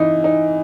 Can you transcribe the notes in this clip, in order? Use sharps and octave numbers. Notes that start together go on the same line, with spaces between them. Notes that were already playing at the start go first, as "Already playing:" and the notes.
Already playing: E3 D#4
D#4